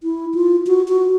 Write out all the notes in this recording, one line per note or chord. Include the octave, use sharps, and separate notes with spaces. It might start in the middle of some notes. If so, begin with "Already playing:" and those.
E4
F4
F#4
F#4